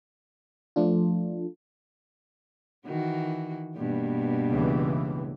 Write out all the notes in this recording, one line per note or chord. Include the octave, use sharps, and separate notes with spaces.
F3 A3 D4 F4
D#3 E3 F#4
G2 B2 A#3
C#2 E3